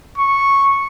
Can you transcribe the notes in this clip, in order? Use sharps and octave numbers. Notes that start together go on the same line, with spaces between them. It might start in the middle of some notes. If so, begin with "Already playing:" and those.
C#6